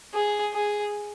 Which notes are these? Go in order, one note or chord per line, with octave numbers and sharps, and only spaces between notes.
G#4
G#4